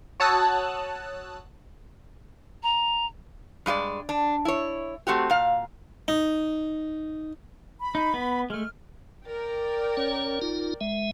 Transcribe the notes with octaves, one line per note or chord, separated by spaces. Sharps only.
F#4 C#5 A5 D#6 E6 F#6
A#5
G2 G#3 F#4 D5
D4
E4 C#5
A3 C4 F#4 G4
A#2 F5
D#4
B5
D#4
B3
G#3 A3 F6
A#4 D5 G5
C#4 C#5
D#4 F4
G#3 E5